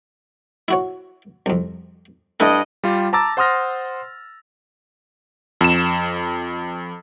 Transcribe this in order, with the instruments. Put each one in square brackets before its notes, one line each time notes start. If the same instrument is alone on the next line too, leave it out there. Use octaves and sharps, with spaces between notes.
[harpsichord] E4 F#4 C#5
C2 F2
[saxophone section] G2 D#5 [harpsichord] A3 E4 A4
[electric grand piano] G3 F4 G4
A5 A#5 D6 E6 A6
C5 F#5 C6 D#6 F6 A#6
F2 E7